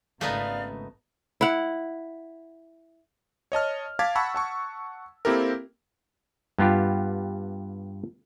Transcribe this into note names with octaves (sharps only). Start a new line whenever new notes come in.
G#1 C#3 A3 B3 D#4 D5 F5
E4 F#5
C#5 D#5 A5 F6
F5 A5 D6 G#6 A6 B6
F#5 A5 B5 C#6 E6
F#5 A5 C#6
A#3 C4 E4 G4 A4 A#4
G2 B3 F4 G4